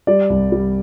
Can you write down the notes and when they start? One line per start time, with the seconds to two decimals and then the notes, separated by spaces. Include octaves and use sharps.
0.07 G3 D5
0.30 C2
0.52 G3